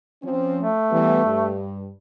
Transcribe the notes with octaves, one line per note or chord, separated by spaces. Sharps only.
F3 C4 C#4
A3
E3 G3 B3
G2